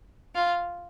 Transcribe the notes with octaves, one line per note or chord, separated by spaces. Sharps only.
F4